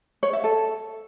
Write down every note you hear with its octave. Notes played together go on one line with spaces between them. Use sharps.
C#5
E5
A4